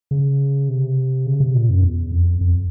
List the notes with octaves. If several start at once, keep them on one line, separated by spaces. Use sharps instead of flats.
C#3
C3
C#3
C3
A#2
F#2
E2
F2
F2